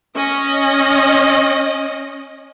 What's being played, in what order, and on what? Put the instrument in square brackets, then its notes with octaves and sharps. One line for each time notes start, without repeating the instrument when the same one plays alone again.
[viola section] C#4 D#5